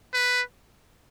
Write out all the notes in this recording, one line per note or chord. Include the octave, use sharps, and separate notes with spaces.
B4